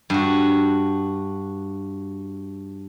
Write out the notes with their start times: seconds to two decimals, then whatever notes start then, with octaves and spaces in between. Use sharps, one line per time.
0.10 G2 F#4